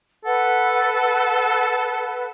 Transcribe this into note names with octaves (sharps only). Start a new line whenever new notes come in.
A4 B4 F#5